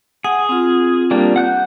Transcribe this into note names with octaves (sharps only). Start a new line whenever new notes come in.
G#4 F#5
C4 F4
G3 A#3 D4
F#5 F#6 G6